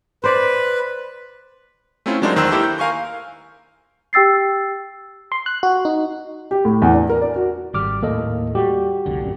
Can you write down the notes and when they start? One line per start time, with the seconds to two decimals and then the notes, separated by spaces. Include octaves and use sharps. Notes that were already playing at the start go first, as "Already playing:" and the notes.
0.24 B4 C5 D5
2.06 A3 C4 C#4 E4 F4
2.22 F#3 G#3 D4 D#4 A#4 C5
2.36 E2 D#3 C5 A#5 E6 F#6
2.51 A#3 D#4 E4 G4 A4 C5
2.63 G6
2.78 A#4 F5 G#5 C#6 G6
4.13 G4 G5 E6 A6 C7
5.32 C6
5.46 F#6
5.63 F#4
5.85 D#4
6.51 G4
6.65 A2
6.82 E2
6.94 D4
7.09 A#4
7.22 D5
7.36 F#4
7.74 G#1 G3 D6 F6
8.03 D#2 A2 A#3 A4 D#5
8.55 G3 F#4 G4
9.06 F1 C2 D3
9.21 G1 F#2 A#2